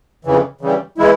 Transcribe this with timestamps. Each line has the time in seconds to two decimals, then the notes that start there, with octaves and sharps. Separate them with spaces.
0.25 F2 C#3 E3
0.61 C#3 E3 G3
0.98 E3 G#3 E4